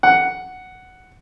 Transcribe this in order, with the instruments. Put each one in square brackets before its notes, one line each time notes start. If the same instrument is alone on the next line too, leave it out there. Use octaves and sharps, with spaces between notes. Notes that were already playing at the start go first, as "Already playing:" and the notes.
[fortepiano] F#5